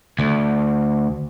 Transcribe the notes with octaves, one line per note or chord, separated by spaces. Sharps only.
D2